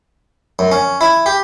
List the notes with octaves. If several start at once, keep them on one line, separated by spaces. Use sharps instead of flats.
F#2
C#4
E4
G4